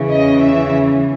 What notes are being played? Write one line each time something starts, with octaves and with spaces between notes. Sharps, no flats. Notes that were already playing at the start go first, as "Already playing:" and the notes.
Already playing: E2 C#3 E3
D#5
E5